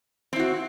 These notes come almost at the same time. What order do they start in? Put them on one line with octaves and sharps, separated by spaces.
C4 E4 F#4